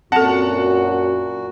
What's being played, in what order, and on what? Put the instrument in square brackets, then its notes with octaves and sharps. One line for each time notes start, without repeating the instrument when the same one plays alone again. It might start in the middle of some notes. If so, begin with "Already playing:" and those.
[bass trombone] F#2 [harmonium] A#2 F#4 [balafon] C4 A4 [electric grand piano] F#5 A5